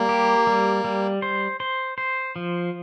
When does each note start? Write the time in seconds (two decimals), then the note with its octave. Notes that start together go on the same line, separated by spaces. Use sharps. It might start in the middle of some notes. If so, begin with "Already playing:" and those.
Already playing: G3 A#3
0.09 G4
0.47 G3
0.84 G3
1.22 C5
1.60 C5
1.98 C5
2.36 F3